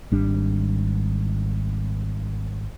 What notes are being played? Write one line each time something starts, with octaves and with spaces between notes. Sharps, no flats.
G#1 G3 D4